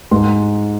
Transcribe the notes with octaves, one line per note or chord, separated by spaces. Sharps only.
G#2 C6